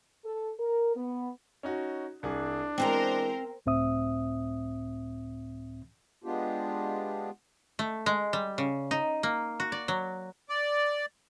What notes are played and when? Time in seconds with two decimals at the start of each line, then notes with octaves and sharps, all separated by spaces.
0.25 A4
0.60 A#4
0.95 B3
1.63 C#4 D#4 F#4
2.23 C2 D4 G#4
2.78 E3 G#3 C4 A#4 C5 G#5 A#5
3.66 C#2 A2 C4 E5 D#6
6.24 G#3 B3 D4 F4 G4
7.79 A3
8.06 G#3
8.33 G3
8.58 C#3
8.91 D#4
9.23 A#3
9.60 F#4
9.72 D5
9.88 F#3
10.49 D5